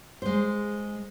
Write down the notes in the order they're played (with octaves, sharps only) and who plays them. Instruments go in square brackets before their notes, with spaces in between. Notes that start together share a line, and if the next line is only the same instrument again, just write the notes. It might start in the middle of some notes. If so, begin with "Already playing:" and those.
[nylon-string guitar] G#3 C5